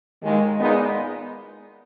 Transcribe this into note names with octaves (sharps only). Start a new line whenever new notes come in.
D#2 D#3 G#3
A#2 G#3 B3 D#4